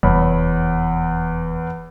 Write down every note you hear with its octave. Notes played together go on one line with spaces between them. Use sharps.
F1 E2 C#5 B5